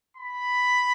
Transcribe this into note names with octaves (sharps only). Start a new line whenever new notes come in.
B5